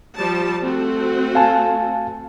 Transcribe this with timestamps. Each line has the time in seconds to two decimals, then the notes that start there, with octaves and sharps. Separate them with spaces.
0.15 F3 G3 A5
0.62 A3 C4 F#4
1.35 F5 G#5 A5